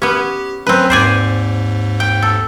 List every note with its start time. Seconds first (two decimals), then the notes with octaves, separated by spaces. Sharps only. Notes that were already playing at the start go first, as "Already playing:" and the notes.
0.02 B3 C#4 G4
0.67 F#3 C4 C#4 B4
0.90 D#2 G#2 C5 D5 G#5
2.00 G5
2.22 A4